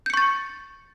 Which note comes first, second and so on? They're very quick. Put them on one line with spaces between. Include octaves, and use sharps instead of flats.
G6 C#7 C#6 A6